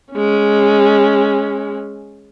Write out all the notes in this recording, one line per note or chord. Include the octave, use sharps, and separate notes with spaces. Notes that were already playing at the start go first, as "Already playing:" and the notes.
G#3 C#4